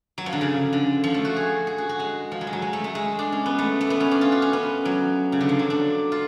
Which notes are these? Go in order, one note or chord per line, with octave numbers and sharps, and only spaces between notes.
F#3
F3
D3
C#3
D3
F3
A3
F#4
G#4
G#4
F#4
F#4
G#3
F3
F#3
G#3
F#3
G#3
A3
A3
G#3
D4
C#4
B3
A3
A3
B3
C#4
D4
F4
F#4
C#4
B3
F#3
C#3
D3
F3
F#3
D4
F4